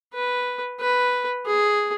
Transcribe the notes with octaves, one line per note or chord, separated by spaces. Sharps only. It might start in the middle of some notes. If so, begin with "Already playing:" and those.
B4
B4
G#4